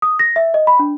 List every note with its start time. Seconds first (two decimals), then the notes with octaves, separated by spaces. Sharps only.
0.02 D#6
0.19 A#6
0.36 E5
0.54 D#5
0.67 B5
0.79 D4